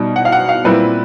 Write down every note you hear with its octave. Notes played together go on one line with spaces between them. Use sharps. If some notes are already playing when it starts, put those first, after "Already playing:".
Already playing: B2 G3 D#4
F#5
F5
F#5
F5
A#2 G3 C4 E4 B4